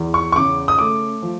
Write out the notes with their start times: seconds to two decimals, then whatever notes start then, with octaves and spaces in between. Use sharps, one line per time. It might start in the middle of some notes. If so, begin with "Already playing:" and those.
Already playing: E2
0.14 C#6
0.32 C#6
0.36 C#3 D6
0.68 D#6
0.79 A3 D6
1.22 F3